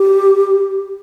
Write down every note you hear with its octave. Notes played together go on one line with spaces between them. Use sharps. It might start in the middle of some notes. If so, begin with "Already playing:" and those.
Already playing: G4